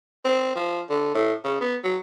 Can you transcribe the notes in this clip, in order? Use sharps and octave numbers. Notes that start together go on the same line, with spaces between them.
C4
F3
D3
A2
C#3
B3
F#3